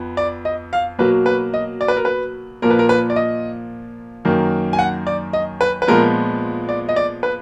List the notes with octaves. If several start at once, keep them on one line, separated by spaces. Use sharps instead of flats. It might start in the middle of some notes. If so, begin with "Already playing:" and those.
Already playing: F2 B3
D5
D#5
F5
B2 F#3 A#3 B4
B4
D#5
D5
B4
A#4
B4
A#2 F3 A#3 A#4
B4
A#4
B4
D5
D#5
F#2 D#3 A#3
G#5
F#5
D5
D#5
B4
B4
A#2 F3 G#3 B3 A#4
D5
D#5
D5
B4